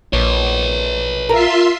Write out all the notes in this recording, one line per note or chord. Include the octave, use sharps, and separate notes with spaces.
A#1 B4 C#5
F4 A#4 E5 C6